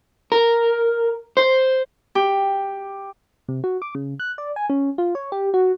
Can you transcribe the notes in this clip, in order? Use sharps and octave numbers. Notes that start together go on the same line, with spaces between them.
A#4
C5
G4
C3
F#4
D6
C#3
F#6
D5
G#5
C#4
F4
C#5
G4
F#4